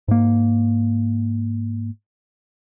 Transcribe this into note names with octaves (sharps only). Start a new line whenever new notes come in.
G#2 A#3